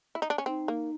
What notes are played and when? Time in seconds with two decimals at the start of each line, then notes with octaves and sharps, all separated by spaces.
0.15 E4
0.22 D#4
0.30 D4
0.38 C#4
0.46 C4 D#4
0.68 A#3